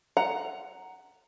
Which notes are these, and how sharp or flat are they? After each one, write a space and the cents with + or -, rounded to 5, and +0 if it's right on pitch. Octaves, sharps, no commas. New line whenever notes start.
F#5 +10 A#5 +0